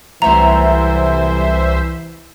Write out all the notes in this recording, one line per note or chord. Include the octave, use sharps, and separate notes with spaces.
C2 E3 F#3 A3 C5 E5 A#5